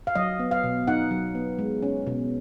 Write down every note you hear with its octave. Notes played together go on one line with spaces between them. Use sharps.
F5
F#3 D#5
B3
F5
B2
D#4 F#5
F#3
B3
G#3
C#4
B2